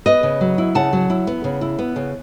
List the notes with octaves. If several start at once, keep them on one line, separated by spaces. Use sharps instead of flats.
B3 B4 D#5
C#3
F#3
E4
C#3 F#5 A5
F#3
E4
B3
C#3
E4
B3
C#3